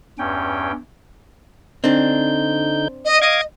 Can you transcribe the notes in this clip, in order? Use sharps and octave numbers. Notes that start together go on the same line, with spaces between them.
E2 G2 C#4 G5
D3 C4 D4 D#4 G6
D#5
D#5 F5 D6 G#6